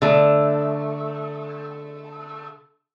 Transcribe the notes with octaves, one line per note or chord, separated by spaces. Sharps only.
D3 A3